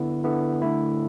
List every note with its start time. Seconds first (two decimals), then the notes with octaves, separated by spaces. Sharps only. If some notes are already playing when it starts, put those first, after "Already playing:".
Already playing: D3 B3 E4
0.24 D3 B3 E4
0.62 D3 A3 E4